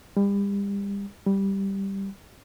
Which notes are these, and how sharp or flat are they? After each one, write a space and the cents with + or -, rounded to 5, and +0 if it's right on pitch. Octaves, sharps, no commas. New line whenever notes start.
G3 +35
G3 +0